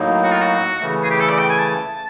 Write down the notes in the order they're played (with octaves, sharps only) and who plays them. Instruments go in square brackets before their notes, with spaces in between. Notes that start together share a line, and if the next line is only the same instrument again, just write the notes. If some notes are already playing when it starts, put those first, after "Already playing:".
Already playing: [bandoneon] A2 F#3 A#3 D#4
[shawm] F#4
F4
F#4
[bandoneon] C#3 E3 A3
[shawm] G#4
G4
A4
D5
G5
G#5
A5